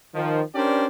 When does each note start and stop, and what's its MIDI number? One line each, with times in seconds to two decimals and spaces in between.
0.14 0.41 51
0.14 0.41 53
0.55 0.86 61
0.55 0.86 62
0.55 0.86 67
0.55 0.86 70
0.55 0.86 72
0.55 0.86 74